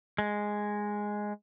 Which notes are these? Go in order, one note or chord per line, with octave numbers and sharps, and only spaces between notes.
G#3